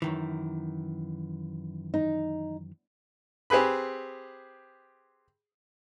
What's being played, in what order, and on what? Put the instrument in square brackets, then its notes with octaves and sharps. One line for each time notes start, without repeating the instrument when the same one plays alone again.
[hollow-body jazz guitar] F#2 D#3 E3
[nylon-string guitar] D#4
[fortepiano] C4 G4 G#4 B4 B5